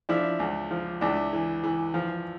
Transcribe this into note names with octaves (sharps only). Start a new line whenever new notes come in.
F3 D4 E4
C#2
F3
C#2 D4 E4
E3
E3
F3